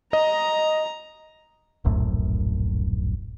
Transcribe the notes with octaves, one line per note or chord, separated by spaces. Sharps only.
D#5 A#5
D1 A#1 F#2 A2